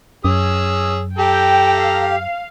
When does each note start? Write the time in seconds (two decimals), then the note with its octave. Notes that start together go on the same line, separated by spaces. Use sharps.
0.25 F#2 C#4 G#4 E6
1.18 G4 A4 G5 A#5
1.78 F5